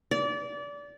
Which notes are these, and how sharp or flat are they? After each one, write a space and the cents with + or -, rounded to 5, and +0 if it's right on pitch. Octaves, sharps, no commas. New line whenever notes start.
D5 -25